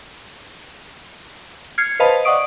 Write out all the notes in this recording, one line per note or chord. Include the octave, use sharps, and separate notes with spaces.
F6 G#6 C7 C#7
B4 C5 D#5 F5 A5 B5
D5 D#5 F#5 C#6 D#6 D7